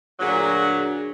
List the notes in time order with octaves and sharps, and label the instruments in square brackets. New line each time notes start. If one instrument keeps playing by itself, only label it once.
[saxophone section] D2 A#2 F#3 [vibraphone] D4 F#4 G#4